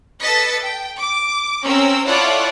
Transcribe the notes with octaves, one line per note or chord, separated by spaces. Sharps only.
A4 B4 D#5 A6 B6 C#7
G5
D6
C4 C#4 A#4 E6
E4 F4 A4 C#5 D5 F#5